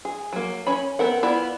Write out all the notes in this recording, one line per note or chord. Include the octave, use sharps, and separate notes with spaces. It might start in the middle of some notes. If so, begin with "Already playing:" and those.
G#4
F#3 A#3
C#4 C#5 B5
B3 C4 A#4 F#5
B3 E4 F4 D5 B5